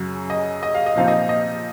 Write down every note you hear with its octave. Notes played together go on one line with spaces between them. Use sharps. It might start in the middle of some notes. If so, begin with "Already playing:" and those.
Already playing: F#2 C#3 F#3
D#5
D#5
F5
D#5
A#2 F3 C4 D#4 F5
D#5
D#5